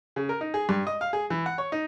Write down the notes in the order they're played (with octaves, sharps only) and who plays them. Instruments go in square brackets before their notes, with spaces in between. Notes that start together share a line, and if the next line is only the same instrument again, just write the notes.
[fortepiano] C#3
A#4
D#4
G#4
G2
D#5
F5
G#4
E3
F#5
C#5
D#4